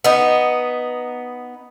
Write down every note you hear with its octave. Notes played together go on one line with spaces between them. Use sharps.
B3 D#4